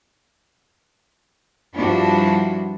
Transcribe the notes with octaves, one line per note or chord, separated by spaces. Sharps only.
G2 F3 G3 D4 E4 F#4